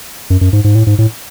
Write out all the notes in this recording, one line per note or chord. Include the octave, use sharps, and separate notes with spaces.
F#2
F#2
G#2
G#2
A2
G#2
A2